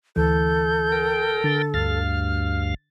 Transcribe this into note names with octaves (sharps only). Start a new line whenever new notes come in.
D2 E3 A4 G6
A#4 G5
D3 A6
D2 G2 F5 F6 A6